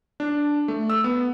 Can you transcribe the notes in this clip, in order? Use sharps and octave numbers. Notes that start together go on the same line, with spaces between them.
D4
A3
E6
B3